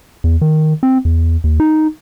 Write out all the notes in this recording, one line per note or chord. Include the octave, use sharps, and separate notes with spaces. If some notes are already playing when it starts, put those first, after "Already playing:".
E2
D#3
C4
E2
D#2
D#4